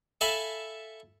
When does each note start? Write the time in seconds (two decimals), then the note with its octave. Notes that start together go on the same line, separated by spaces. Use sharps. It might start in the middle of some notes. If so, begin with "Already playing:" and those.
0.21 A4 E5 F5 G#5 A5 B5